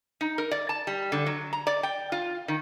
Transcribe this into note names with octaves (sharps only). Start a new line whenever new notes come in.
D#4
A#4
D5
A5
G3
D3
F#3
A#5
D5
G5
F4
D#3